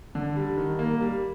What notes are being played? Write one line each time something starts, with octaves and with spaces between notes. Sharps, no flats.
D3
G3
D#3
A#3
G3